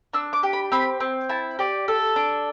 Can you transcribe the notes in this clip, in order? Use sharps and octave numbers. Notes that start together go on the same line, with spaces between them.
D4 E6
D6
G4
B5
C4 B5
C4
E4 A5
G4 D5
A4
D4